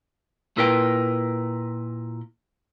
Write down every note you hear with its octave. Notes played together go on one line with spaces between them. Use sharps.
A#2 E4 A#4 B4 G5